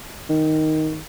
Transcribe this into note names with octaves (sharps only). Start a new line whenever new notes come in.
D#3